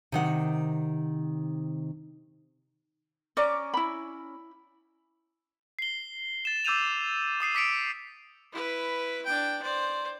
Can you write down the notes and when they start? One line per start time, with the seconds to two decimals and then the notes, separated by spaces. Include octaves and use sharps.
0.12 C3 D#3 F#5
3.37 C#4 D5 A#5 D6
3.74 E4 B5
5.79 C7 G7
6.45 A6 E7
6.65 D6 E6 G6 A6 D#7 F7
7.40 D6 D#6 C7 D#7
7.55 D6 B6 C#7 D7 F7
8.52 E4 B4
9.25 D4 G5
9.62 C5 D5